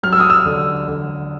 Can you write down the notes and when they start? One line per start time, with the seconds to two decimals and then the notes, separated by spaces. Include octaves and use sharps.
0.03 F#3 F6
0.13 E6
0.20 D#6
0.30 E6
0.46 D3
0.88 D3